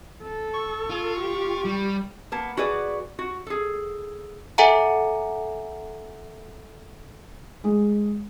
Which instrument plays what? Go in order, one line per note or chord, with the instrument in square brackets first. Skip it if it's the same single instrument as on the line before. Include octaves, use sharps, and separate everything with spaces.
[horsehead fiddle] A4
[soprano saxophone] C#6
[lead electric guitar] F4
[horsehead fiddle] G4
[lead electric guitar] G3
[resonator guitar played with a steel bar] A#3 B3 A5
F#4 G#4 B4 D5
F#4
G#4 A4
[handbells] A4 E5 F#5 G#5 A#5
[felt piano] G#3